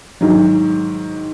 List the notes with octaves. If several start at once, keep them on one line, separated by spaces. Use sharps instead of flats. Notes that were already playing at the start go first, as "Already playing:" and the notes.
G#2 D#3 F#3